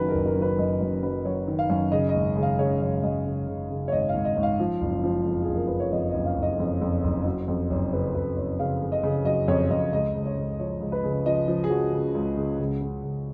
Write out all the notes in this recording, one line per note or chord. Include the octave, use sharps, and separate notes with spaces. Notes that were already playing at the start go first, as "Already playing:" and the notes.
Already playing: F#1 F#2 D#3 F#3 B4
A#4
F#1
A#4
F#3
B4
F#2 D#5
F#2
F#3 B4
F#3 C#5
D#3
F5
F#2
C#3 D#5
D#5
G#1
C#3
F5
C#3 C#5
F#2 C#5
F#2 D#5
C#3
C#3
C#3
C#5
G#1 D#5
F5
G#1
D#5
G#1
F5
F3
F#1
F3
F2
G#4
F#1
A#4
F#1 B4
C#5
F2 D#5
F#1 D#5
F5
F#1
D#5
F2
F2
F#1
F#3
F2
F#1 C#5
C#5
C#3 B4
F#1 B4
F#1 C#5
C#3 F5
C#3
D#5
C#3
F#3 D#5
F2 C#5
F2 D#5
C#2 D#5
C#2
C#5
C#2
F3 C#5
C#2
B4
C#3
F3 D#5
F3
G#4
F3 F#4
C#3
C#2
C#3
C#2
C#3
C#2